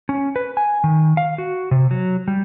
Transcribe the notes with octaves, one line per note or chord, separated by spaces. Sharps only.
C#4
B4
G#5
D#3
F5
F#4
C3
F#3
G3